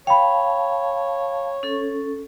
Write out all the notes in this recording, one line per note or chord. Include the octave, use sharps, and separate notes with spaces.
C#5 F5 G5 A5 B5
C#4 A4